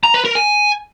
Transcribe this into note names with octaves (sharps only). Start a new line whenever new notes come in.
A#5
B4
A#4
G#5